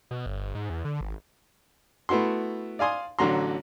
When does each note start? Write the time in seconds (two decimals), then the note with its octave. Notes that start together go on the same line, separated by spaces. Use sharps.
0.11 B2
0.26 G1
0.55 G#2
0.70 E2
0.85 D3
1.01 G#1
2.09 A3 B3 E4 F#4 C6
2.79 D5 F5 G#5 C6 D#6
3.19 A1 D3 F#3 F#4 A#5 C6